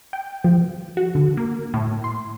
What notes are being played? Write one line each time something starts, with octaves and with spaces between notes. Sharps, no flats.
G5
F3
F#4
D3
A#3
A2
C6